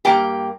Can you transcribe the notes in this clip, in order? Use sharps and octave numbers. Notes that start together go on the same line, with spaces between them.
G2 G3 A#3 G4 G5